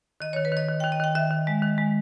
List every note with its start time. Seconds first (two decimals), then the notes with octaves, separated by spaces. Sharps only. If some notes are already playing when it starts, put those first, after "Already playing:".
0.20 D#3 D#5
0.33 D#3 C#5
0.45 B4
0.52 D#3 D#5
0.68 D#3
0.80 D#3 G5
0.92 D#5
1.00 D#3 G5
1.15 D#3 E5
1.31 D#3
1.47 G#3
1.62 D#3
1.78 G#3